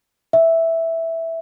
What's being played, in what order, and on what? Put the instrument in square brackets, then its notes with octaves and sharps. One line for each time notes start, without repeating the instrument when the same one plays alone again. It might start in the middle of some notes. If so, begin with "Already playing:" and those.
[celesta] E5